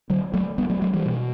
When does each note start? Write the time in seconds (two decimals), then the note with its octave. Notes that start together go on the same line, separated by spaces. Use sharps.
0.10 D3 F#3
0.34 F#3 A3
0.58 G3 B3
0.70 F#3 A3
0.82 F#3 A3
0.94 E3 G3
1.06 B2